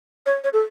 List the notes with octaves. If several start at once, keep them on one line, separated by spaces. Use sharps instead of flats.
C#5
C#5
A4